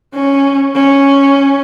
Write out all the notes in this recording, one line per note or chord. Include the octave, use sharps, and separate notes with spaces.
C#4
C#4